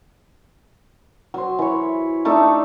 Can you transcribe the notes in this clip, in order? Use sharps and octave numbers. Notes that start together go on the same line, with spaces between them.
F#3 C5
E3 C#5
A3 D4 D#4 A4